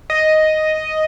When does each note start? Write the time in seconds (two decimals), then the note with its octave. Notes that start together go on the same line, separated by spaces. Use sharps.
0.10 D#5